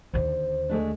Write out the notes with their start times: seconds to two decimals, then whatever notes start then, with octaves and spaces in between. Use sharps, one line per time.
0.14 D#2 D3 C5
0.69 G#3 A3 D4